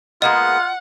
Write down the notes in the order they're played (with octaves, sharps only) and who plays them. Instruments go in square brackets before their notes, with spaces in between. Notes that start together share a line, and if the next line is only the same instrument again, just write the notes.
[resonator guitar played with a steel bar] G#3 A#3 B3 [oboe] F4 [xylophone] D#5 [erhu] F#5